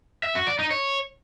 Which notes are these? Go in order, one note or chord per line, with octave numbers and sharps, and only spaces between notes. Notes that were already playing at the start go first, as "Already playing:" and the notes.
E5
F#4
D5
D#4
C#5